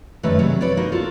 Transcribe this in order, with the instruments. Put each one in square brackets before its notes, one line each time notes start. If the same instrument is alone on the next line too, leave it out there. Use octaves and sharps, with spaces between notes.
[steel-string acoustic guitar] F#2 D#3 G3 A3 B4 D#5
C3 F#3 G#4
B4 C#5 D5
A#3 D#4 F#4
F4 F#4 A4